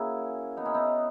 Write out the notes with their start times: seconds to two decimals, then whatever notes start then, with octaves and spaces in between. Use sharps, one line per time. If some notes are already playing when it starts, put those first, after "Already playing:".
Already playing: A#3 C#4 E4 F#4 G#4
0.57 B3 D#4
0.65 C#4 E4
0.74 B3 D#4